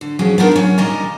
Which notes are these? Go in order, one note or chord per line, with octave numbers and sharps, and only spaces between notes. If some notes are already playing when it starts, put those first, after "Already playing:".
D3
F3 F#3 C#4 G#4
B3 D4 D#4 F4 A#4 F#5
F#3 C#4
A#2 D#3 G3 D#5 G#5 A#5